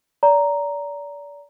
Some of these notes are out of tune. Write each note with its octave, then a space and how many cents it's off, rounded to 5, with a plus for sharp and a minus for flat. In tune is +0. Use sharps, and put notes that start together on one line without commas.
D5 -30 A#5 +0